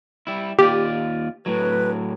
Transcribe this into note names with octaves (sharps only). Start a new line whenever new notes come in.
G3 E4
D#2 F4 G4 D5
A2 F#3 B4